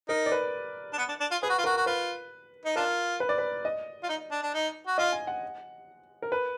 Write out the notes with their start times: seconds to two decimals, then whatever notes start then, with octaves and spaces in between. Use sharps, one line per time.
0.09 D#4 A#4
0.26 D5
0.32 B4
0.93 D4
0.98 B3
1.08 D4
1.20 D4
1.31 F4
1.43 G#4 B4
1.50 F#4
1.58 F4
1.64 F#4 A#4
1.77 F#4
1.86 F4 B4
2.66 D#4
2.76 D4 F4 A#4
3.20 B4
3.29 D5
3.38 B4
3.65 D#5
4.03 F4
4.09 D#4
4.31 D4
4.43 D4
4.54 D#4
4.87 F#4
4.98 F4 D#5
5.12 G#5
5.27 F#5
6.22 A#4
6.32 B4